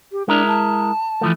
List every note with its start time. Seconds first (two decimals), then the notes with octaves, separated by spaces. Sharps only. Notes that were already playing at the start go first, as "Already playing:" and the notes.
0.11 G4
0.28 G#3 D4 E4 A#4
0.47 A5
1.21 E3 F3 A3